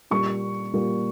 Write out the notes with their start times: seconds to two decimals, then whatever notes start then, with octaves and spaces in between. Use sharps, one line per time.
0.11 A#2 G3 A#3 C#6
0.73 A#2 G3 A#3